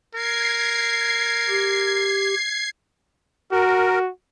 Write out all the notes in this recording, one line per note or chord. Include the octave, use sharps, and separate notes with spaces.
A#4 G#6 C7
G4
F#4 A#4